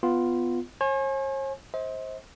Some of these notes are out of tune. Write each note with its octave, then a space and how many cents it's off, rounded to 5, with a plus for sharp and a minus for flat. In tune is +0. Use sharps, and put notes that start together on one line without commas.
B3 +10 F4 +0
C#5 -45 G#5 +20
C5 +15 D#5 +45